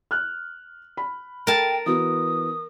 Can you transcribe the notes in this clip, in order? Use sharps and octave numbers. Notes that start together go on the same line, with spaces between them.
F6 F#6
B5
A#4 G5 A5
E3 B3 F#4 D#6